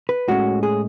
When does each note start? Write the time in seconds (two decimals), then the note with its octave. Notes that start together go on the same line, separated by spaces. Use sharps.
0.09 B4
0.28 A2 G#3 C#4 F#4
0.63 G#4